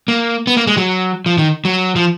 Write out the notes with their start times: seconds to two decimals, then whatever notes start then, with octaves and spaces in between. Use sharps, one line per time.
0.08 A#3
0.47 B3
0.57 A#3
0.67 G#3
0.77 F#3
1.26 F3
1.38 D#3
1.65 F#3
1.96 F3